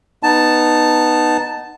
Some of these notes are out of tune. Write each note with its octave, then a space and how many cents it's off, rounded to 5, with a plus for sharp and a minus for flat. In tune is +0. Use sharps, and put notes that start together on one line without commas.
B3 +0 D#4 -15 A5 +0